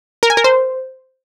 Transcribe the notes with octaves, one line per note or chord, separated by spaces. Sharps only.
A#4
G#5
A#4
C5